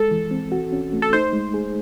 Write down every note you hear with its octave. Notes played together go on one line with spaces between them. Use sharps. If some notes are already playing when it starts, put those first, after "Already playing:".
Already playing: G#3 A4
E3
C4
F#4
C#4
A3
A4
D#4 C5
G#3
G#4